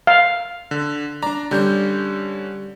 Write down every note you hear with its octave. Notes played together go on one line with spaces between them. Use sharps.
F5
D3
D4 D5 A#5
D3 G3 C#4 D4 G6